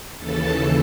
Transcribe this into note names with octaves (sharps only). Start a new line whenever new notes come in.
D#2 C#3 E3 A4 A5